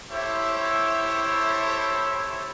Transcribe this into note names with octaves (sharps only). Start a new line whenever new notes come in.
E4 G4 A4 C5 C#5 E5